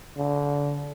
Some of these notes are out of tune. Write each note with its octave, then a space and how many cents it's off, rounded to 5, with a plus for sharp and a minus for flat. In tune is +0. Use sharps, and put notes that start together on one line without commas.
D3 -30